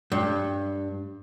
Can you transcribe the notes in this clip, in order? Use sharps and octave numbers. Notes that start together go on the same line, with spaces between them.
G2